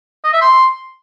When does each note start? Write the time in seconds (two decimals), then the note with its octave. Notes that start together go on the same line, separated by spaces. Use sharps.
0.24 D#5
0.33 E5
0.42 C6